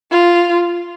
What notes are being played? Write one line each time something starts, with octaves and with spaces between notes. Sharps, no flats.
F4